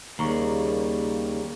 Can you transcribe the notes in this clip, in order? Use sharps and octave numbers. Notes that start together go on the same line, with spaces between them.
D#2 C#3 G3 A#3 A#5 C#6